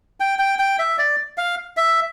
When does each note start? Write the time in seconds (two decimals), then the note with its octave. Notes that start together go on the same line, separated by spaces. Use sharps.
0.20 G5
0.39 G5
0.59 G5
0.79 E5
0.98 D5
1.38 F5
1.77 E5